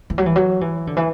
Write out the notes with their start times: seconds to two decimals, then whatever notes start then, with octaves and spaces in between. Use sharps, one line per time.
0.10 E3
0.18 F#3
0.26 E3
0.36 F#3
0.61 E3
0.87 D3
0.97 E3